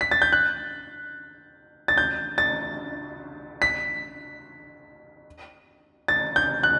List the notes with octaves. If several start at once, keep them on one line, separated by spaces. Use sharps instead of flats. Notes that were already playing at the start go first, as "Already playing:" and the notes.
B6
A6
G6
F#6
A6
G6
A6
B6
A6
G6
F#6